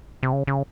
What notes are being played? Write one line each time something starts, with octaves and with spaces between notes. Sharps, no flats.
C3
C#3
C#3